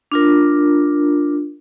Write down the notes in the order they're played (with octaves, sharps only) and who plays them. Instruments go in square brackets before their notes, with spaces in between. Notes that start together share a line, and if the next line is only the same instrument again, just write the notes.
[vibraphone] D4 F4 A#4